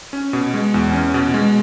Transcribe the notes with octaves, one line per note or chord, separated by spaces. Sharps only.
C#4
B2
G#3
E2
C#4
B2
G#3